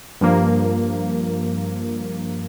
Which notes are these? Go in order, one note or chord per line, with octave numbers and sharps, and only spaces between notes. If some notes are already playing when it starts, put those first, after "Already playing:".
G2 F3 A#3